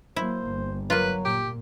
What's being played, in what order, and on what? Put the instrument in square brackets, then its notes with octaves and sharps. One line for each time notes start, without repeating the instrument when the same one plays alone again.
[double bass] F#3 A#3 [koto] E4 [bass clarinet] C5
[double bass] G1
[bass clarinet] F#3 [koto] A#3 F4 [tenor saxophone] B4
[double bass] A#2 [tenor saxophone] G4